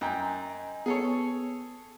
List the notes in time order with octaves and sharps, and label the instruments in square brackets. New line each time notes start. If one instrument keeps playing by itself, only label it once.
[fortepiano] F#2 G5 [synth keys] D#5 G#5 A#5
[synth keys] B3 [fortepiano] G#4 A4 C#5